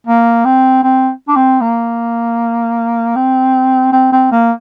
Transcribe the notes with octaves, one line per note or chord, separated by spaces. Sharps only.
A#3
C4
C4
D4
C4
A#3
C4
C4
C4
A#3